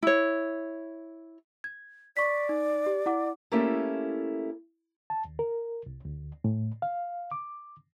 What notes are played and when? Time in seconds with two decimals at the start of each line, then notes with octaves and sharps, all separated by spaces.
0.03 E4 C#5
1.64 G#6
2.17 D5 C#6 B6
2.49 D#4
2.86 G4
3.06 E4 F#5 D6
3.52 A3 A#3 C#4 E4 G4 A4
5.10 A5
5.25 D#2
5.39 A#4
5.86 C2
6.05 D2
6.44 A2
6.82 F5
7.31 D6